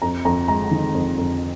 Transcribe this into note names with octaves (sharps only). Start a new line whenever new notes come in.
F2 A#5
F2 A#5
G#3 A#5
D#3
F2
F2